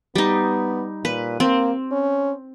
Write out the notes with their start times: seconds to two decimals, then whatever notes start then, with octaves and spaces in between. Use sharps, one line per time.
0.15 G3 B3 D#4
1.05 A#2 B4
1.40 A#3 C4
1.92 C#4